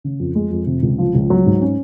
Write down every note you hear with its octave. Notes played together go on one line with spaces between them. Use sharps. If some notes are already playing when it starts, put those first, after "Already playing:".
C#3
F2
G#3
F2
C3
C#2
F3
C#2
F#3
G#2
C#4